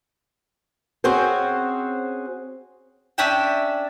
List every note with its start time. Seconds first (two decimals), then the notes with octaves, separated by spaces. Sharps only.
1.04 C4 C#4 F#4 G#4 C5
3.18 C#4 D4 E5 G5